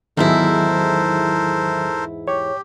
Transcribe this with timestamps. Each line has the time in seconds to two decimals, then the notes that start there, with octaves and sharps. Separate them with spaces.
0.17 E2 G#2 D#3 F#3 E4 A4 A#4 C5
2.28 G4 C#5